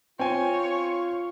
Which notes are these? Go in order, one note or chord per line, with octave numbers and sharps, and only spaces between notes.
C4 F4 C#5 G5 G#5